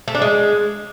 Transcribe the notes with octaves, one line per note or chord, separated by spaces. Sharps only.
A3
D4
G#3